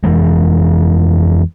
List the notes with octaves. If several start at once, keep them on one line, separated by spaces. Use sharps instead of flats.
F2 E3 G#3